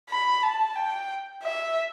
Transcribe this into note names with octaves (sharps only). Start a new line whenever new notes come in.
B5
A5
G5
E5